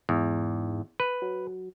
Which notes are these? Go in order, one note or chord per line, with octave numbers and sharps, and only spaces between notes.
E2 G#2
B4
F#3